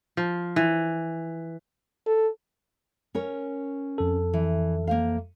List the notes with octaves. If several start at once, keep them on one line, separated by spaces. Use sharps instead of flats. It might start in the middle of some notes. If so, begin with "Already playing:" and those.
F3
E3
A4
C#4 A#4 C#5
F2 A4
E3
A#3 C5 F5